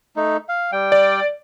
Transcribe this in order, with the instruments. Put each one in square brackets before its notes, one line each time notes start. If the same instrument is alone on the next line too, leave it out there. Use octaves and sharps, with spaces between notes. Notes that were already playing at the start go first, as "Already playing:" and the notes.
[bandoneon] A3 D#4
F5
G3 G5
[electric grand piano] D5